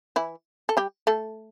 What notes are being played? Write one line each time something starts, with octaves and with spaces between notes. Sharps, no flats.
E3 E4
A4
G3 G4
A3 A4